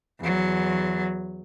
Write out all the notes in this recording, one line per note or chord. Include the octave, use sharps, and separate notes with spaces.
E2 F#3